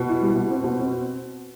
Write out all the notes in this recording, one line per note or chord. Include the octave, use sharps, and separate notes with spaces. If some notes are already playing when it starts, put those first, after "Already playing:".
Already playing: B2
E4
G3
B2
C4
B2
C4